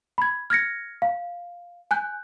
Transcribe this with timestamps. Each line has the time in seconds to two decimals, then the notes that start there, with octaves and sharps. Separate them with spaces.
0.18 B5 G#6
0.50 F6 G#6 A#6 C#7
1.02 F5
1.91 G#5 F#6 G6